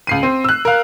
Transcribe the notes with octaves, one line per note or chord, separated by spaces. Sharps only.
C#2 C7 D#7
C4
E6 F#6
A#4 F5